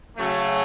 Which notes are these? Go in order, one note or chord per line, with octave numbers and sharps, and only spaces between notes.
C#3 F#3 A3